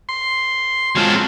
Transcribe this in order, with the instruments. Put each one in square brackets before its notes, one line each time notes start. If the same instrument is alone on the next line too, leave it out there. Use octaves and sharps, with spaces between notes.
[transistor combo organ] C6
[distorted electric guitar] F#3 A4 [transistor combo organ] G#3 C4 F4